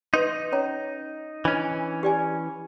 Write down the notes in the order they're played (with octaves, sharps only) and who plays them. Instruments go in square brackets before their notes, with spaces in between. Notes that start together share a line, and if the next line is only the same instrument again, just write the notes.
[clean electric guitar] D#4 [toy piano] B4 C6
[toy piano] C#4 C#5 A#5
[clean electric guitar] E3 C#4 [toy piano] D4 D#5
[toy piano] G4 D5 G#5